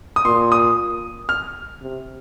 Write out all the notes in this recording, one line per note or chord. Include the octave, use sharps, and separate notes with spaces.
D#6
A#2 C6
D#6
F6
C3